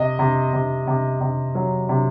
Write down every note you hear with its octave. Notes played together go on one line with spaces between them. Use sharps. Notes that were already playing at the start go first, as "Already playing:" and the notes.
Already playing: C3 D#5
C3
C3
C3
C3
F#3
C3